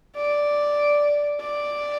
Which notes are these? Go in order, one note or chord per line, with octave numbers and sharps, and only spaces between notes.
D5
D5